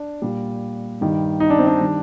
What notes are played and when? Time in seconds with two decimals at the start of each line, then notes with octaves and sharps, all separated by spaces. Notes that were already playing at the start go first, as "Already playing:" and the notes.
Already playing: D4
0.22 A#2 G3
1.01 G2 D#3 G3
1.40 D#4
1.50 D4
1.58 C4
1.67 D4
1.80 D#3 G3